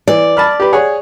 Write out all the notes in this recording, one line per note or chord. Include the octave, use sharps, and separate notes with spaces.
E3 D5
A5 B5 F6
G4 B4
G#4 C#5 F#5